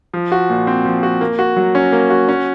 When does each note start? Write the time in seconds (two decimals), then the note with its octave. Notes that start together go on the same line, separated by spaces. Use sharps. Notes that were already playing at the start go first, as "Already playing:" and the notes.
0.14 F3
0.32 F#4
0.50 A#2
0.67 C4
0.85 F3
1.03 F#4
1.21 A#3
1.39 F#4
1.57 F#3
1.75 C#4
1.92 A#3
2.10 F#4
2.29 C#4